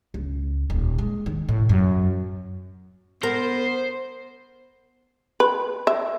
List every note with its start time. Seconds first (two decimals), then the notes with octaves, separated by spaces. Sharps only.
0.14 C#2
0.70 D#1
0.98 G#3
1.26 D#3
1.49 A2
1.69 F#2
3.23 B3 A#4 C5
5.40 B4
5.87 E5